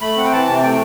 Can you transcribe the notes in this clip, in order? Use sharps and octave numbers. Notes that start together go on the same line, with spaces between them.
A3 B5
C4 F#5
G5
E3 A5
C3
A3 G5